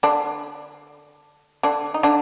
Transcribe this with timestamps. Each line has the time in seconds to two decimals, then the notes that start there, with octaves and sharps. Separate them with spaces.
0.03 D3 D4
1.63 D3 D4
1.94 D#4
2.03 D3 D4